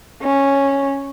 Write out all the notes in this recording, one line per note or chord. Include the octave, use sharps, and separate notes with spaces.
C#4